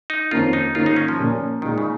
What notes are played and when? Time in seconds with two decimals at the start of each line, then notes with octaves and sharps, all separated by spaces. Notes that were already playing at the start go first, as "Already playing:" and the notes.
0.10 D#4
0.31 F2 D#3 A#3 C#4 F4
0.53 D#4
0.75 G#2 D#3 A#3 C#4 F4
0.86 D#4
0.96 C#4
1.08 F3
1.19 A#2 A#3 C#4
1.62 A#2 D#3 G#3 D#4
1.78 C#3